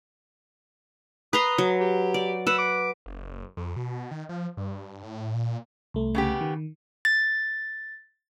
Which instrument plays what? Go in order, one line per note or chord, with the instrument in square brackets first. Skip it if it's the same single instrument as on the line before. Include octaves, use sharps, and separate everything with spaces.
[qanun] B4 A#5 C6 [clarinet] D#6
[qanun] F#3
[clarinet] G4
[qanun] D5
[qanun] B4 F#5 [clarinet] E6
[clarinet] D6
[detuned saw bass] F#1
F2
B2
D#3
F3
G2
A2
A#2
[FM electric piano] C2 A3
[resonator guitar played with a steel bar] C#3 B3 G4
[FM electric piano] D#3
[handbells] A6